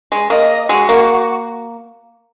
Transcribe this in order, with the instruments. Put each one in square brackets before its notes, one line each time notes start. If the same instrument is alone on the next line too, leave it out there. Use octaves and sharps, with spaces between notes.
[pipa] G#3
[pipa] A#3 [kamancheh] D#5
[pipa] G#3 [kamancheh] F#4
[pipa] A#3